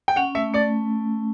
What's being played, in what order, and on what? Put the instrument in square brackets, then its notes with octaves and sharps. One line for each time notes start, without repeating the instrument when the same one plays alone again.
[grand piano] G5
[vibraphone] C#4 [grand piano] F#5
[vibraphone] A3 [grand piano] E5
[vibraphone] A3 [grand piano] D5